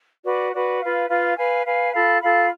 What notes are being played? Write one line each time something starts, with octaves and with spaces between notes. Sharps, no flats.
F#4 B4 D5
F#4 B4 D5
F4 B4 F5
F4 B4 F5
B4 F5 G#5
B4 F5 G#5
F4 A4 F5 B5
F4 A4 F5 B5